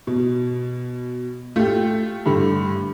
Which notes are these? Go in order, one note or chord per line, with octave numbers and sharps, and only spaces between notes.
B2
A3 F4 G4
G2 D3